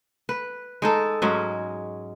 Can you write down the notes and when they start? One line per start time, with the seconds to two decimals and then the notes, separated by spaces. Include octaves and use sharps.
0.29 B4
0.82 G#3 D#4 A4
1.22 G#2 F#3 G#3 C#4